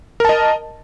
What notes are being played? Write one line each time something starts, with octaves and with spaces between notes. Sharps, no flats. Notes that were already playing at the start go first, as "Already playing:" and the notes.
A#4 D#5 A5